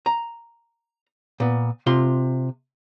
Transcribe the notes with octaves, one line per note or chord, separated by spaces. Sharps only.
A#5
A#2 B3
C3 F4 C6